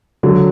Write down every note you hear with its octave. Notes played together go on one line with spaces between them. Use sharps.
D3 F#3